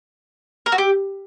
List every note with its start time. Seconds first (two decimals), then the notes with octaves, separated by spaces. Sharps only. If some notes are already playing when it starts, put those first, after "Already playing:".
0.66 A#4
0.72 F#4
0.78 G4